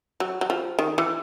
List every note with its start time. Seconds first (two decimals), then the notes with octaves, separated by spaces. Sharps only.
0.20 F#3
0.41 F#3
0.50 F3
0.79 D#3
0.98 E3